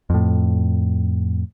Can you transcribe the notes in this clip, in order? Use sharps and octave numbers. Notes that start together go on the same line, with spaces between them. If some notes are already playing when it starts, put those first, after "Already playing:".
F2 A2